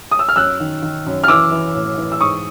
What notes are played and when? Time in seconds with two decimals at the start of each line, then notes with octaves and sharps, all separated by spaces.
0.11 D#6
0.19 E6
0.29 F6
0.36 F#2 E6 F#6
0.60 D#3
0.82 D#3
1.06 F#2
1.24 F6
1.28 E3 D6 E6
1.51 E3
1.75 A2
1.98 E3
2.12 E6
2.20 G#2 C#6 D#6